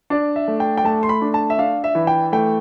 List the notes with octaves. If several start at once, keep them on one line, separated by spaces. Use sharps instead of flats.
D4 D5
E5
A3
G5
G5
A3 A5
C6
B5
D4
A5
E5
D4 F5
E5
E3
G5
A3 G5